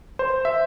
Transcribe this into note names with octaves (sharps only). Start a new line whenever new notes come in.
C5
E5